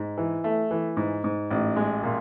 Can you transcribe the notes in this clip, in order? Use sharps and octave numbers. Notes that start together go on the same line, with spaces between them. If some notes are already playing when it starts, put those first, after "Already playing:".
Already playing: G#2
E3
A3
E3
G#2
G#2
A1
G#3
A#2